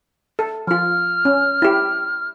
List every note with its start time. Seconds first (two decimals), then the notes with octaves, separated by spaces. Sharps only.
0.39 A4
0.67 F3 F4 F6
1.25 C#4
1.62 E4 G4